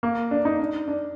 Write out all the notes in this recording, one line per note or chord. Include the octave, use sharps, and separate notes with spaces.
A#3
D4
D#4
D4
D4